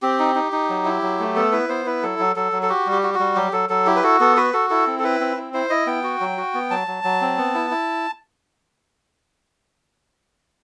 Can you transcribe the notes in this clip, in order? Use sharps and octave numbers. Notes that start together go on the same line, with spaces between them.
C4 G4
D#4
D#4
D#4
F#3
E4
F#3
A3
B3 A4
E4 B4
B3 C5
E4 B4
F#3 A4
F#3
F#3 A4
F#3
A4
F#4 G4
G3
G4
F#4
F#4
G3
F#3 G4
F#3 A4
F#3 A4
E4 G4
B4
F#4 A4
B3 A4
F#4 B4
F#4 A4
E4 A4
C4
A4
E4 B4
C4
E4
E4 C5
E4 D#5
B3 G5
F#4
F#3
F#4
B3
F#3 A5
F#3
F#3
C4
B3
E4
E4